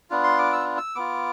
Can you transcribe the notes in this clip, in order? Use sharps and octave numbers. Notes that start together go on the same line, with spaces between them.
B3 D4 F4
C6
D6
E6
E6
B3 F4 D6